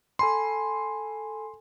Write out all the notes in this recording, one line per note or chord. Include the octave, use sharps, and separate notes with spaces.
A4 G#5 B5 C6